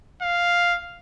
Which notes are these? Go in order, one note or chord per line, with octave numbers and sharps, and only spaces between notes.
F5